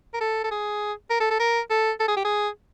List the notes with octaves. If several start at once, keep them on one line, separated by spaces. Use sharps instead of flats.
A#4
A4
A4
G#4
A#4
A4
A4
A#4
A4
A4
G#4
G4
G#4